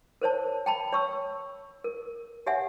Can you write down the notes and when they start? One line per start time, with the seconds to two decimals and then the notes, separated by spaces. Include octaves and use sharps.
0.22 A#4 C5 C#5 A5
0.66 G5 A5 B5
0.93 C#5 C#6 E6
1.84 A#4
2.47 G4 C#5 E5 F#5 G#5